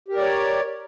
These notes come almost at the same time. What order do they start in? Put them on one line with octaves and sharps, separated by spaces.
G4 A#4 D5 C#5